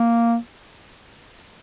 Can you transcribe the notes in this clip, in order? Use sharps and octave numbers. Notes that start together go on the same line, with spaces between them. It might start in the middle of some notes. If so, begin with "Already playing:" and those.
Already playing: A#3